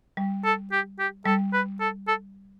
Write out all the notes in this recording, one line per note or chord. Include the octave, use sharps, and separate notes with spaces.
G3
A4
G4
G4
G3 A4
B4
A4
A4